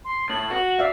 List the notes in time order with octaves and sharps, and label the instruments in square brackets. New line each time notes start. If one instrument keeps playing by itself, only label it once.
[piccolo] C6
[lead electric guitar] A2 [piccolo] F#7
[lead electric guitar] F#4
[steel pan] D5 E5 F5